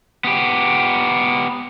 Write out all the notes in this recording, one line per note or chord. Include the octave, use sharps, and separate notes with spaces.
B3 G4